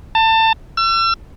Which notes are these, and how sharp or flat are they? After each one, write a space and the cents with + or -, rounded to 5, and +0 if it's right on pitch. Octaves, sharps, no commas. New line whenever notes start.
A5 +25
E6 +40